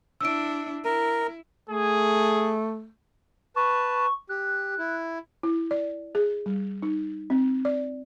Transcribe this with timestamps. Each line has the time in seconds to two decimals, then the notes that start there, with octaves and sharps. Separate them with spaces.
0.21 D4 E4 E6 D7
0.85 E4 A#4
1.69 A3 G#4
3.56 B4 A5 C#6
4.29 G4 F#6
4.79 E4
5.43 E4
5.71 D5
6.15 G#4
6.46 G3
6.82 D#4
7.30 C4
7.65 D5